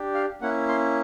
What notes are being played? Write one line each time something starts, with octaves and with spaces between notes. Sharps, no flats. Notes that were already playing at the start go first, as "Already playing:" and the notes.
Already playing: D4 G4
F5
A#3 C#4 E4 F#5
C6